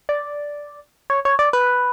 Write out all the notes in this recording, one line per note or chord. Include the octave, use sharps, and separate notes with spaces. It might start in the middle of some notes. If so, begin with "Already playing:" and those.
D5
C#5
C#5
D5
B4